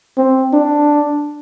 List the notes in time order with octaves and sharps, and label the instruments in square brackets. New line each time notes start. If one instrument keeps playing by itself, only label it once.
[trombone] C4
D4